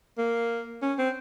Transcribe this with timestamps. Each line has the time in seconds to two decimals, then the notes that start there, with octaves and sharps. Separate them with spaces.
0.18 A#3
0.82 C#4
0.98 C4